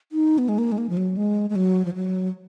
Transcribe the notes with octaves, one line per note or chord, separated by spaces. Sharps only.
D#4
B3
G#3
A#3
G#3
A#3
F3
F#3
G#3
G#3
F#3
F3
F#3